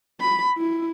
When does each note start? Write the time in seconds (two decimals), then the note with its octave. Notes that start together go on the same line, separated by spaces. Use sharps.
0.20 B5
0.58 E4